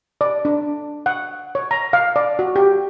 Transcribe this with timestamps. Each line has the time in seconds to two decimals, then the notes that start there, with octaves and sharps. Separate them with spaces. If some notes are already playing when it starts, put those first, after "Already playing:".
0.21 D5
0.45 D4
1.06 F#5
1.55 C#5
1.71 A#5
1.93 F5
2.16 D5
2.39 F#4
2.56 G4